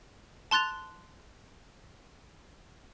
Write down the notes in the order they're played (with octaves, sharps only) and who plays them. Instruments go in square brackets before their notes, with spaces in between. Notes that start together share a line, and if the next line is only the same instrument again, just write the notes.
[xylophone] A5 C6 F#6 A6 F7